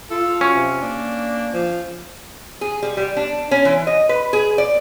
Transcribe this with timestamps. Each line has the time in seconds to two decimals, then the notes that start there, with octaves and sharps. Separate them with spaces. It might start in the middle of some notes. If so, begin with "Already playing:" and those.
0.10 F4 A4
0.41 F#3 C#4
0.55 C3
0.82 A#3 D4
1.53 F3
2.61 G#4
2.83 G3
2.97 G3
3.16 D4
3.51 C#4
3.65 E3
3.87 D#5
4.09 B4
4.33 G#4
4.58 D5